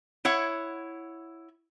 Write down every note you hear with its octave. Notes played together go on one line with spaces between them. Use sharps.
E4 C#5 F#5